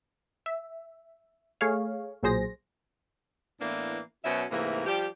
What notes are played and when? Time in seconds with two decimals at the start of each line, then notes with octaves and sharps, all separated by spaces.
0.46 E5
1.61 A3 G#4 C#5 F5
2.23 B1 A#2 F#3 G#4 C5 A#6
3.61 A2 E3 A#3 B3 D4
4.25 B2 F#3 C#4 C5 E5
4.51 G#2 C3 E3 A3 A#3
4.86 F3 G3 G4